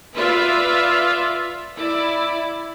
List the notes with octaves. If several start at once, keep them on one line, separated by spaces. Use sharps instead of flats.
F4 B4 D5 E5 F5
E4 D5